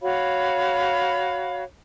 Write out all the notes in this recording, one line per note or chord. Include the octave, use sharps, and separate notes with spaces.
F#4 C#5 F5 B5